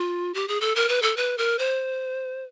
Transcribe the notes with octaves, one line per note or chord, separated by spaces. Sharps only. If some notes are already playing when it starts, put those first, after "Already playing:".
Already playing: F4
G4
G#4
A4
A#4
B4
A4
B4
A#4
C5